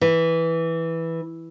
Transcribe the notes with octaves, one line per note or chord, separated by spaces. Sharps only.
E3